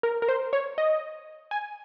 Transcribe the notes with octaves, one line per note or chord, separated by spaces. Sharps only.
A#4
A#4
C5
C#5
D#5
G#5